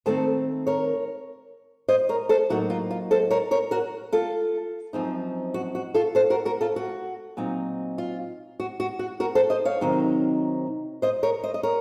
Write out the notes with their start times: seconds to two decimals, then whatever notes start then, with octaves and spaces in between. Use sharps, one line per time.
0.06 D#3 A3 C4 A4 C5
0.67 A#4 C#5
1.88 C5 D#5
2.09 A#4 C#5
2.29 A4 C5
2.50 A2 F#3 A#3 D#4 F#4
2.70 F4
2.91 F4
3.11 A4 C5
3.30 A#4 C#5
3.51 A#4 C#5
3.71 F#4 A#4
4.13 F4 A4
4.93 F#2 F3 C4 D#4
5.54 F#4
5.75 F#4
5.94 F4 A4
6.15 A4 C5
6.30 F#4 A#4
6.45 F#4 A#4
6.61 F4 A4
6.76 F#4
7.37 A#2 F#3 C4 D#4
7.98 F4
8.60 F#4
8.80 F#4
8.99 F#4
9.20 F#4 A#4
9.35 A4 C5
9.50 C5 D#5
9.65 C#5 F5
9.81 C3 D#3 F#3 C4 D#4
11.02 C5 D#5
11.23 A#4 C#5
11.43 C5 D#5
11.54 D#5
11.63 A#4 C#5